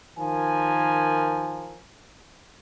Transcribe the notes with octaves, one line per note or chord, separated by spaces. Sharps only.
D#3 F3 A#4 G#5